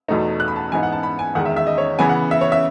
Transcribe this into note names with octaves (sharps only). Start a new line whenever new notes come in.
E2 B2 A3 D#4
F#6
B5
A5
G#2 E3 B3 D#4 G#5
F#5
A5
B5
G#5
E2 D#3 G#3 F#5
E5
E5
D#5
C#5
C#3 E3 B3 G#5
F#5
E5
C#5
E5